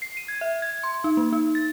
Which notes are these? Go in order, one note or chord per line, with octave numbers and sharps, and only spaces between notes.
C7
D#7
G#6
E5
G#6
C6
D#4
A#3
D#4
A6